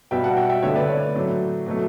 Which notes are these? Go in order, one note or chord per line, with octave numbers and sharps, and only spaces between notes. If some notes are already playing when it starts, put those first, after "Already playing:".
B2 G3 E5 G5
F#5 A5
E5 G5
E5 G5
D3 A3 C#5 E5
B4 D5
C#5
A2 F#3 A3
B2 F#3 A3